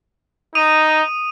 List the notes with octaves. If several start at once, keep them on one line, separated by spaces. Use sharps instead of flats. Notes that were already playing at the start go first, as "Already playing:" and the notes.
D#4 D#6 D#7 F7